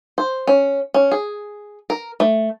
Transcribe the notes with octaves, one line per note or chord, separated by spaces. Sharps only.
C5
C#4
C#4
G#4
A#4
A3